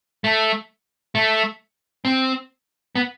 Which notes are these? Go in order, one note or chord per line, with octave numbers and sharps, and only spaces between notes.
A3
A3
C4
B3